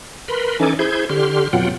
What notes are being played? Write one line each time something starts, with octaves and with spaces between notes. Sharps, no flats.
A#4 B4 B5 C6
E3 C#4 D#4 A4 G#5 D6
E4 G#4 C5 G6 G#6
D3 G4 C6 F6
F2 B2 F#3 F4 F#5 G5